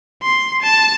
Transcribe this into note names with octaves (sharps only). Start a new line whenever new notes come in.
C6
A5